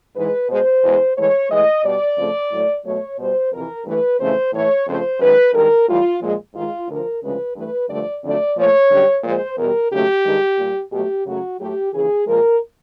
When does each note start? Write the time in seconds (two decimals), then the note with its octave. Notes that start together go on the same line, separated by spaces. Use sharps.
0.16 G#2 E3 G#3 B4
0.49 B2 G#3 C5
0.83 E2 B2 G#3
1.16 A2 E3 G#3 C#5
1.50 A2 E3 G#3 D#5
1.83 B2 G3 D5
2.18 F2 C#3 F3 A3
2.51 A2 F#3 A3
2.84 B2 F#3 A3 C#5
3.19 B2 G3 C5
3.52 F2 C3 E3 A#4
3.85 G2 E3 A3 B4
4.19 F2 C#3 E3 A3 C5
4.53 A2 E3 A3 C#5
4.86 F2 C#3 F3 A3 C5
5.20 F#2 D#3 G#3 B4
5.53 G2 D#3 G#3 A#4
5.87 A2 E3 G3 F4
6.21 A#2 F3 G#3
6.54 G#2 D#3 G#3 F4
6.88 D2 D3 F3 A#4
7.22 D2 C#3 F3 G#3 B4
7.55 G2 E3 A3 B4
7.89 G2 D3 F3 A3 D5
8.23 F2 D3 F#3 A3 D5
8.56 A#2 F3 A3 C#5
8.90 F#2 D3 G3
9.24 A#2 F3 G#3 C5
9.57 E2 B2 G3 A#4
9.91 D#2 C#3 F#3 A3 G4
10.25 G2 D#3 G#3
10.59 A#2 G3
10.92 B2 F#3 A3 G4
11.25 F#2 C#3 F#3 A3 F#4
11.59 A2 F#3 A3 G4
11.93 D#2 C#3 E3 G#4
12.26 A#2 F3 G#3 A#4